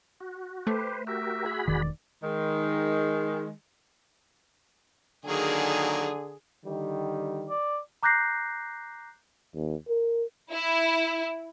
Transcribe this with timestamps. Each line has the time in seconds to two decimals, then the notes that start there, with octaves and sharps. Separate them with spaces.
0.20 F#4
0.67 A3 G4 B4 C5
1.07 F#4 G4 A#4 E5
1.46 F#4 G#4 B5
1.68 E1 D#3 D5
2.23 D#3 G#3
5.25 D3 D#3 F#3 A#3 G#4
6.65 D3 D#3 G3
7.50 D5
8.03 A#5 D6 F#6 G6 A#6 C7
9.55 D#2
9.88 A#4
10.51 E4